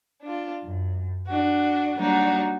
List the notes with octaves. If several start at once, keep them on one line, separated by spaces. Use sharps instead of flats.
D4 F4
F#2
D4 F#4
F#3 G3 A#3 D4 D#4 F#4